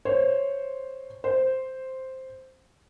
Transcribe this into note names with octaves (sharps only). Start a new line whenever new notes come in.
C5 C#5
C5